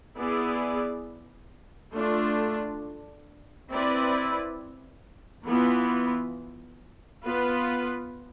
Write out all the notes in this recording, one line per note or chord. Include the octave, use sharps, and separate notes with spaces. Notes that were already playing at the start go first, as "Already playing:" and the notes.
B3 E4 G#4 D5
A3 D4 F4
C4 E4 B4 D5
E3 B3 F4
B3 F4 B4